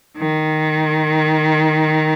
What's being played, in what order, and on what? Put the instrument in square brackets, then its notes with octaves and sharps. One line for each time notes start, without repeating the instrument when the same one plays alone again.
[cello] D#3